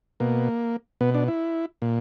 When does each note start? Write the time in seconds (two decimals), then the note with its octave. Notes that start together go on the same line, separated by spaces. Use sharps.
0.20 B2 A#3
1.01 B2 B3
1.14 D4
1.28 E4
1.82 A#2